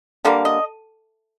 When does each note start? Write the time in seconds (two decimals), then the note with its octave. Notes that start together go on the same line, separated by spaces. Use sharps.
0.25 D3 G3 A#3 F5
0.45 D#5